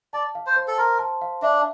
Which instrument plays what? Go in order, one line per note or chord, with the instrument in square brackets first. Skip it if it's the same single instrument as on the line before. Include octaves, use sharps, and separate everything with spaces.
[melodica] D5 [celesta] A5
[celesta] F5
[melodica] C5
[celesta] C5
[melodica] A4
[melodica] A#4 [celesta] C6
[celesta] A5
F5
[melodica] D4 [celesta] E5